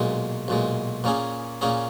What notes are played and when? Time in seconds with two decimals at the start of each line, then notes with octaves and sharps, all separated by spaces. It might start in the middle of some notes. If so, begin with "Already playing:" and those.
Already playing: B1 A#2 G#3
0.48 B1 A#2 G#3
1.04 A#2 A#3 C#4 G#4
1.61 A#2 A#3 C#4 G#4